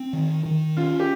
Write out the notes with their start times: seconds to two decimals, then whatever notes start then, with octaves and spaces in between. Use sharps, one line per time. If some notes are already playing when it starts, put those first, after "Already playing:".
Already playing: C4
0.13 D#3
0.45 D#3
0.77 C#4 F4
1.00 G4